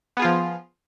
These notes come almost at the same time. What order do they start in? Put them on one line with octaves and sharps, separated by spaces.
B3 G#4 F4 F3